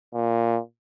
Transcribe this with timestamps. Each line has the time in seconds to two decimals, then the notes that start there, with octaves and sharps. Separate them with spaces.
0.14 A#2